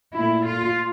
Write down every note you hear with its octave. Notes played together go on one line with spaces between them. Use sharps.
A#2 A3 E4
F4